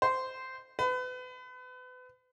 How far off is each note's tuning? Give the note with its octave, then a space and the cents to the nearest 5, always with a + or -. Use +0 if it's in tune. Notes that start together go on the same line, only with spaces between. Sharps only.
C5 -15
B4 +35